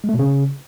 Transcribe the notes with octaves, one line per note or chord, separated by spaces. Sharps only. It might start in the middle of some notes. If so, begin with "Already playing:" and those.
G#3
A3
B2
C#3